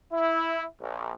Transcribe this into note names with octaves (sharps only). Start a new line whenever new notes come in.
E4
A#1